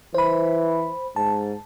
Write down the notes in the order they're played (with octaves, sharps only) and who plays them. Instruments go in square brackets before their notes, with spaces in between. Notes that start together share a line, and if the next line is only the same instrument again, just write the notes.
[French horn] E3 [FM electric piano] C5 B5
[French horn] G#2 [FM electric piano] A5